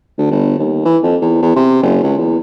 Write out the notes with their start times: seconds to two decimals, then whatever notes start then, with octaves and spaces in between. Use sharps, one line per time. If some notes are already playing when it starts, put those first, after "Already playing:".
0.18 D2
0.31 G1
0.59 D#2
0.85 E3
1.03 F2
1.21 E2
1.42 E2
1.56 C3
1.83 F#1
2.03 C#2
2.18 E2